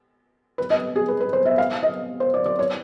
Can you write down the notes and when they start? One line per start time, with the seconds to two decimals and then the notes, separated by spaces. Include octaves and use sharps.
0.58 B4
0.70 D#5
0.96 G#4
1.08 B4
1.21 B4
1.33 C5
1.45 E5
1.58 F5
1.83 D#5
2.20 C5
2.34 D5
2.46 D5
2.59 C#5